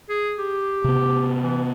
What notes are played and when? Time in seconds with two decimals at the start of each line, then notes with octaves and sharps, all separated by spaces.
0.10 G#4
0.39 G4
0.84 C3 B3
1.43 E3